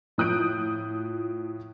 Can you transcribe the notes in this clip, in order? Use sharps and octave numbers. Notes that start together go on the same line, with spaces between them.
A2 F3 D#6 F#6 G6 D7